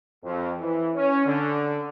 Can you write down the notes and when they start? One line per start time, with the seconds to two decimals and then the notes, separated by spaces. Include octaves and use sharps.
0.24 F2
0.60 E3
0.95 C#4
1.26 D3